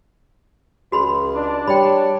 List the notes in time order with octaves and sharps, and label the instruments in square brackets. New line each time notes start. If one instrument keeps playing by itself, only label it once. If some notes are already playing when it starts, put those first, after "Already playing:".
[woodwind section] C#2 [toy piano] F#4 B5 C6
[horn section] D4
[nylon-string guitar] G3 [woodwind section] C#5 [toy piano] G5 B5